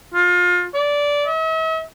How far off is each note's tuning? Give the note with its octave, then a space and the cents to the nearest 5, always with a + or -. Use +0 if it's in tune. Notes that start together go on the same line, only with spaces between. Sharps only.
F4 +30
D5 -15
E5 -45